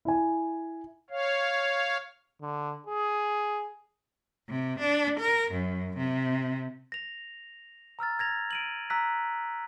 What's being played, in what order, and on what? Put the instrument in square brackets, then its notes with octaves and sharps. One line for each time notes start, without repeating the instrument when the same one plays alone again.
[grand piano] E4 G#5
[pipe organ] C#5 F5
[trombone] D3
G#4
[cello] C3
D4
A#4
F#2
C3
[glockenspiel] A#6 F7
A#5 E6 F6 A6
G#6 A#6 F7
D7 D#7 F#7
A#5 E6 F#6 B6